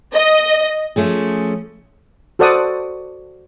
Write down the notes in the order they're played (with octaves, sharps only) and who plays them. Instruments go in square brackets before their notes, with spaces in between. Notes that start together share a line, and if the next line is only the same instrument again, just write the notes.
[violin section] D#5
[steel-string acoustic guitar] F3 A3 C#4 G#4
[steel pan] F#4 A4 C5 D5 F#5 D#6